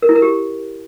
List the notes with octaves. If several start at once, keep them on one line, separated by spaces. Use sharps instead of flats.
A#4
E4
A#4
G4